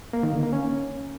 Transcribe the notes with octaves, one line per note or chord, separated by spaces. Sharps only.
A#3
D#3
D3
A#3
C#4